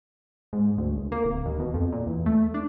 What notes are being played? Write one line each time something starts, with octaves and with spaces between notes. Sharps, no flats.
G#2
D2
C#2
A#3
D1
D#2
B2
F2
A#2
E2
A3
D4